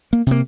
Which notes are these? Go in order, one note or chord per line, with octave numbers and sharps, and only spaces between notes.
A#3
C3 A#3